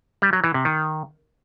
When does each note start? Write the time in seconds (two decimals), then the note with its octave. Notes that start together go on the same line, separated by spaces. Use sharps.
0.22 G3
0.33 F#3
0.44 E3
0.54 C3
0.65 D#3